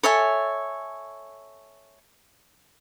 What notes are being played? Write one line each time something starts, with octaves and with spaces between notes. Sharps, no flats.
A4 C#5 E5 G#5